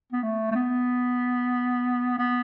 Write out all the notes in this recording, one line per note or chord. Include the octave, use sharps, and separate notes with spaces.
B3
A3
A3
B3
B3